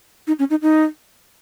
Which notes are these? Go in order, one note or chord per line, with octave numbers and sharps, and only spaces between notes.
D#4
C#4
D#4
D#4